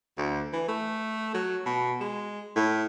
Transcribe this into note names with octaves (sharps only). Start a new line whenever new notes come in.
D2
E3
A3
F#3
B2
G#3
A2